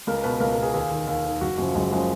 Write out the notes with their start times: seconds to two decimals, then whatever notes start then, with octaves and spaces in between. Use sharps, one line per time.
0.07 C#2 A#4
0.24 B2 B4
0.40 C#2 A#4
0.55 A#4
0.58 B2 G#4
0.74 D#2 G#4
0.91 D#3
1.07 D#2
1.25 D#3
1.41 F#1 F#4
1.58 F#2 C#3 F3 F#4
1.75 F#1 G#3
1.92 C#3 F3 G#3